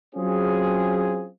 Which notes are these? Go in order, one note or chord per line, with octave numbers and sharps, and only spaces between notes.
F#3 C4 C#4 F4 G#4